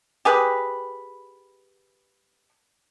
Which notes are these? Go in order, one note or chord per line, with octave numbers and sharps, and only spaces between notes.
G4 G#4 B4